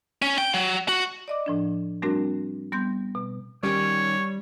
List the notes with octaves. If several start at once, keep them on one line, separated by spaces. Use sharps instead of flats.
C#4
G5
F#3
F#4
D5 D#5 D6
A2 F3 D4
G3 A3 C4 D4 F#4 A#4
G3 B3 C6 G6
B2
D#3 G3 C#4 G4 C#5